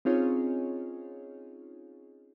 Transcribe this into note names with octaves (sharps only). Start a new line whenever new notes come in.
C4 C#4 D#4 F4 G#4 C#5